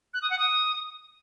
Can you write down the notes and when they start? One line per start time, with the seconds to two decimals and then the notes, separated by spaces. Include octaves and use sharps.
0.14 F#6
0.22 D#6
0.30 F#5
0.39 D#6